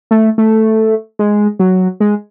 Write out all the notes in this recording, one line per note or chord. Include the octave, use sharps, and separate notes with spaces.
A3
A3
G#3
F#3
G#3